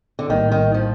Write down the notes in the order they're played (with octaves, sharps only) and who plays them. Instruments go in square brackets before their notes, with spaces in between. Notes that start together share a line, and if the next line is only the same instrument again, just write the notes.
[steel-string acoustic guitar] D3
[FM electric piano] A#1 A2 G3 A#3 [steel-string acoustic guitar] D#3
[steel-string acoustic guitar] D#3
F3